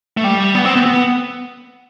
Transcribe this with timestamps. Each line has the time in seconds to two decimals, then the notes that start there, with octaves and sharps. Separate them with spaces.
0.17 A3
0.24 G3
0.55 B3
0.65 C4
0.75 B3
0.86 B3